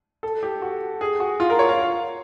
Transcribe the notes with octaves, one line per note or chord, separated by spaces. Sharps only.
A4
G4
F#4
G#4
F#4
F4
A#4
C#5
F5